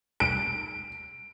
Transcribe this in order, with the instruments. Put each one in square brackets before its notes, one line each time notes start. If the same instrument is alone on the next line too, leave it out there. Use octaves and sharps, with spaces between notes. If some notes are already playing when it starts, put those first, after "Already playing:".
[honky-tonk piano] D7